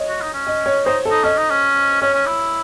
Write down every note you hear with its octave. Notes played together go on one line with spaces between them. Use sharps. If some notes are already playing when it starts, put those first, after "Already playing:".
Already playing: C#5 D#5
F#4
D#4
C#4
D#5
C#5
D#4 C5
A4
D#4
C#4 D#5
D#4
C#4
C#4 C#5
C#4
E4